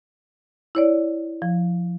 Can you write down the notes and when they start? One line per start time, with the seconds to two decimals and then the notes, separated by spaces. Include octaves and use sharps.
0.75 E4 C#5 D5
1.42 F3